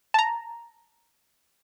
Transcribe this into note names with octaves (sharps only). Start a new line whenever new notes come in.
A5 A#5